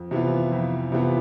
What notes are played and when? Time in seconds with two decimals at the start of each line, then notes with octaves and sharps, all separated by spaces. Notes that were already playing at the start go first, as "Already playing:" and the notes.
Already playing: F2
0.11 C3 E3 B3 F4
0.52 F2
0.92 C3 E3 B3 F4